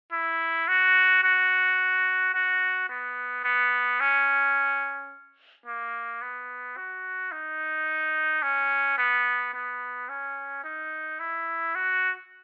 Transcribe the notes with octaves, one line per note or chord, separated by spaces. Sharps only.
E4
F#4
F#4
F#4
B3
B3
C#4
A#3
B3
F#4
D#4
C#4
B3
B3
C#4
D#4
E4
F#4